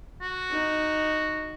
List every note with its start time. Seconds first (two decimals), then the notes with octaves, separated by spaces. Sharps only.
0.22 F#4
0.50 D#4